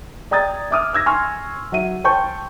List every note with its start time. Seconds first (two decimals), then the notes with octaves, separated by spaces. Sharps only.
0.31 D5 G5 A#5 D#6 G#6 A6
0.71 E5 D6 D#6 F6
0.93 D6 E6 G#6 A#6
1.06 G#5 C6 C#6 F6
1.72 F#3 E5 D#7
2.04 C5 G5 A5 C#6 G6